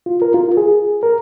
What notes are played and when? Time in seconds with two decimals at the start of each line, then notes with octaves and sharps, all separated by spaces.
0.06 F4
0.22 A#4
0.34 F4
0.57 G#4
1.03 A#4